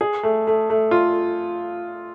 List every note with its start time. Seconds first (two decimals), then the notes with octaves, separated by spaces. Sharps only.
0.01 G#4
0.23 A3
0.47 A3
0.70 A3
0.91 F4